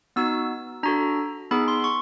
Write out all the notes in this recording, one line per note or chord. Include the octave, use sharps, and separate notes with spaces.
B3 D#4 F#4 E6
D4 F#4 A4 A#5
B3 D#4 G#4 B5
C6
C#6